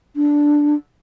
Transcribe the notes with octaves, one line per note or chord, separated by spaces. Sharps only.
D4